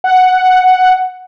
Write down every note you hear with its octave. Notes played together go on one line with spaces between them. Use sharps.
F#5